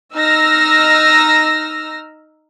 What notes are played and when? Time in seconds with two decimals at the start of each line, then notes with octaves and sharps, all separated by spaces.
0.14 D#4 E6 F6 A#6